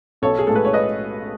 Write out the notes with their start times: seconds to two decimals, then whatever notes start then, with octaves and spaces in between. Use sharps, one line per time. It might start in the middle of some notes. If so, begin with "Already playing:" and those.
0.22 B1 A4 C#5
0.39 G#4
0.47 A2 G#3 A4
0.55 B4
0.65 C#5
0.73 B4 D#5